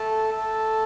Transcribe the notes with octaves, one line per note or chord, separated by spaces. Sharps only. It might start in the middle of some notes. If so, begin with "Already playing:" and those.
Already playing: A3 A4
A3 A4